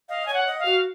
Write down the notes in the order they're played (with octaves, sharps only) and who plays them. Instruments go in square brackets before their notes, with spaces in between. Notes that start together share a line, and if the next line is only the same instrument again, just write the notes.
[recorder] D#5 [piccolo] F5
[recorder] C#5 [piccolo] G#5
[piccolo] F#5
[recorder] D#5
[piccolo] F5
[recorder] F#4